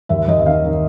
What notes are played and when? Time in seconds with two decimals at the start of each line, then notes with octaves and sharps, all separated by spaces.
0.09 D#2 E5
0.28 D#2 D#5
0.39 E5
0.46 D#3 F5
0.64 D#3